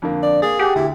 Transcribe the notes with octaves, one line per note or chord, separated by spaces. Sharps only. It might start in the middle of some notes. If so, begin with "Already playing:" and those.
F2 D3 A#3
D5
A#3 G#4 A6
G4 F#5 G#5
D2 E4